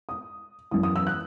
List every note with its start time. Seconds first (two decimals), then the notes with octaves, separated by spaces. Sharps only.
0.09 D#6
0.71 F#2 E3 D#6
0.83 D#6
0.96 E6
1.07 F#6